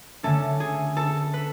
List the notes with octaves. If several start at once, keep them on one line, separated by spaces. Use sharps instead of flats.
D3 A3 C#4 A4
G#4
A4
B4